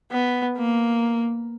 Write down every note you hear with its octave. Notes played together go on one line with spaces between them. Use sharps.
B3
A#3